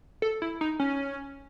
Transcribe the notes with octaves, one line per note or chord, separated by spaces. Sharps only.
A4
E4
D#4
C#4